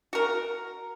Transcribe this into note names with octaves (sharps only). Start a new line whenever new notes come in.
F#4 A#4